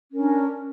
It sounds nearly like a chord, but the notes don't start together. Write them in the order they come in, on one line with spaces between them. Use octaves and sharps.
C#4 A#4 D4